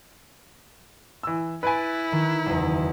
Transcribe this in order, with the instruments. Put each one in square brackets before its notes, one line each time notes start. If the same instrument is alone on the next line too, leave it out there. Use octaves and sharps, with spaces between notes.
[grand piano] E3 E6
[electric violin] E4 [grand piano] B4 G#5 [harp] A6 D7
[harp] D#3
F#1 E2